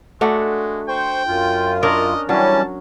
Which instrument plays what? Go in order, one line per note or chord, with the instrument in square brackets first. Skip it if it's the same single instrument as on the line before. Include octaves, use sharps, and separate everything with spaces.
[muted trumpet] G#3 [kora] A3 D4 F#4
[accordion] C5 C#6 [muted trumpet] G5
[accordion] F#2 F4
[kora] C#4 D4 A#4 [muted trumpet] D#5
[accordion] E3 G3 C#4 [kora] F#3 [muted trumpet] A5